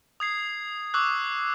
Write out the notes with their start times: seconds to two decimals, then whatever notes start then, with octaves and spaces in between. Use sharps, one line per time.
0.20 D#6 G#6 C7
0.94 C#6 D6 E6 F#6